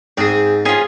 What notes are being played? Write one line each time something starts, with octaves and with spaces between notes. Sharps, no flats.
G#2 C4 G#4
C#4 F4 G#4